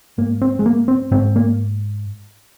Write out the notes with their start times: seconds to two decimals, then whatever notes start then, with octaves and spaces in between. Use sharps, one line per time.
0.18 G#2 A#3
0.42 C4
0.59 G#3
0.66 A#3
0.88 C4
1.11 G#2 C4
1.36 A#3